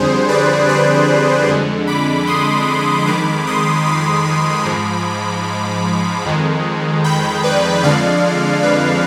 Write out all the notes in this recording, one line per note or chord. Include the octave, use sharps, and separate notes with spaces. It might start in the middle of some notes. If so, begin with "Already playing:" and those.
Already playing: F2 D3 G3 G#4 C5
B4 D5
B4 D5
F2 D3 G#3
B5 D6
C6 D#6
F2 D#3 G#3 B5 D6
C6 D#6
B5 D6
G#2 F3 G#3
F2 D#3 G#3
G5 B5
B4 D5
F2 D3 F3 G#3 D5 F5
B4 D5